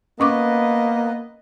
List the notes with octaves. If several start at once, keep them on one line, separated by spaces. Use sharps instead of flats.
A#3 B3 C#4 B4 D#5 C#6 D6